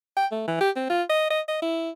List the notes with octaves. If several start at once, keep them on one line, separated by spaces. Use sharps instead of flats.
G5
A3
E3
G4
C4
F4
D#5
D#5
D#5
E4